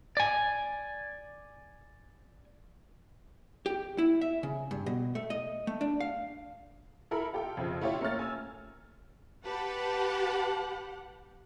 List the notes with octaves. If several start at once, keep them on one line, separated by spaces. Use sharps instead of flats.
D5 G#5
G4
E4
E5
C#3
G2
B2
A3
D#5
A3
D4
F5
E4 A4 A#4 B5
F4 G4 A4 G5
F2 C#3 F3
A3 E4 F4 G4 C#5
A3 A#3 C#4 C#5 F6 A6
G#5 E6
G4 B4 F#5 A5 B5